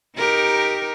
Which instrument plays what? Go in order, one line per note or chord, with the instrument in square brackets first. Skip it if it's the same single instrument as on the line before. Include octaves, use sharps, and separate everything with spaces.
[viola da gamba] D#4 G4 A#4